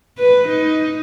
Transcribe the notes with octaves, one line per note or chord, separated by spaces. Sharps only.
B4
D#4